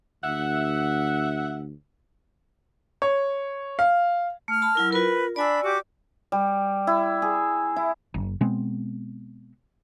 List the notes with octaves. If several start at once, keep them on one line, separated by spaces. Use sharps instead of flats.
D2 E5 F#5
C#5
F5
A3 F6
A5 B5
F#3 E4 A#4
F4 A#4 B4
D4 D5 G#5 B5 E6
F#4 G4 D6
G3
E4
G#4
E4
F#1
B2 G#3 B3 C4